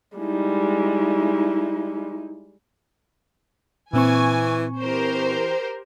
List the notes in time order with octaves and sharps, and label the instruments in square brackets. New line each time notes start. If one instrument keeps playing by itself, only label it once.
[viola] G3 G#3 [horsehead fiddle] D#4 E4
[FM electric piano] A#2 C4 C#6 [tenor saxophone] E3 [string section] G#5
[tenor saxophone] E3 [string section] G4 A#4 C5